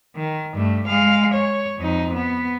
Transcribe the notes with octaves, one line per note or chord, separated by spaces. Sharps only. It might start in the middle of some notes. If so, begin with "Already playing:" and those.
D#3
G2 A3
G#3 F5
C#5
F2 D#4
B3